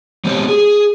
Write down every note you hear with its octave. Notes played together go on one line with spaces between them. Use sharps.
G#3 B3 C4 G4 C5 C#5
G#4